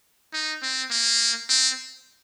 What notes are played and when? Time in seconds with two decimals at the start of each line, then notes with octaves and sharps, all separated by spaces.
0.33 D#4
0.62 C4
0.91 A#3
1.49 C4